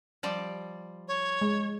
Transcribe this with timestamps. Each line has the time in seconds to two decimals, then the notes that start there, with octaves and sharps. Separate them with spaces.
0.23 F3 G3 D5
1.08 C#5
1.41 G#3